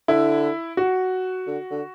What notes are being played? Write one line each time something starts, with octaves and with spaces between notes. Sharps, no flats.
D3 E4
F#4
D3
D3